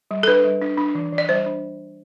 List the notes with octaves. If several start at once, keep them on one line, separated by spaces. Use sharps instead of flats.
G3
A4
D4 B4
G3
D4
D4
E3
E3
D5
G3 C5
D4